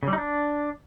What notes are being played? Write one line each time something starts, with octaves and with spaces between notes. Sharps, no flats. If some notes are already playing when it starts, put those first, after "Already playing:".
C#3
G3
D#4
D4